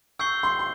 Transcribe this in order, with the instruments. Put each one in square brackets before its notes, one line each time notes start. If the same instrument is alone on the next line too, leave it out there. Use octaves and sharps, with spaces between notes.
[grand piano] C#6 [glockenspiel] E6 G6 C7 G7
[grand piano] C6
C6